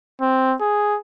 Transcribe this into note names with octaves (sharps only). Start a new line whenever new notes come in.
C4
G#4